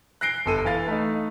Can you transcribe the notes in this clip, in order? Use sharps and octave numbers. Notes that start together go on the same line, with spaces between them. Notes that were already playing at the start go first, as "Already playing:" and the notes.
F#6 A#6 C7 D7 G7
G1 A4 D#7
E3 F5 A6
A3 D#4